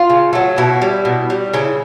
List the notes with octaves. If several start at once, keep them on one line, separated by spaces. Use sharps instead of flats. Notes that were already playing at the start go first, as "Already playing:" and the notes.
Already playing: F4
C#3
F#3 A3
B2 E4
G3
B2
G3
C#3 E4